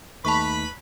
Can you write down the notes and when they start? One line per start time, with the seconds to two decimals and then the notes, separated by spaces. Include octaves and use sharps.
0.25 D#2 A3 D#4 B4 A5 B5 C#6